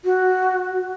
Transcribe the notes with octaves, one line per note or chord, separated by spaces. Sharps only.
F#4